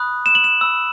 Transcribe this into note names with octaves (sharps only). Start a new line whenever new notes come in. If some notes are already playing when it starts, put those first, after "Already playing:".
Already playing: B5 D#6 F#6
E7
F#7
E7
B5 E6